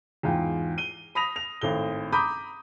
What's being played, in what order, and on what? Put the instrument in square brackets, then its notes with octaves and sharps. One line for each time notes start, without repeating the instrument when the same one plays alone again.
[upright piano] E2 G#2 F4 G5
D#7 G7
B5 D#6 A#6 F7
F7
G#1 A2 G7
A#5 B5 D6 D#6 G6